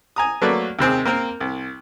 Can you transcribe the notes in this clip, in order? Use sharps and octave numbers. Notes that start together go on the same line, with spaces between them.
G#5 A#5 D#6
F#3 A3 A#3 B4 D5
D#2 C3 C4 G#4
A#3 C4 A#4
C2